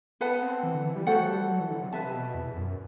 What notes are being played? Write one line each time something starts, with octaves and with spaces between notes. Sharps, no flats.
B3 B4 F#5 A5
C4
E3
D3
E3
G3
A3 F#4 A4 C5 F#5
F#3
G3
F#3
E3
D3
C3
C3 B4 E5 A5
B2
E2
F#2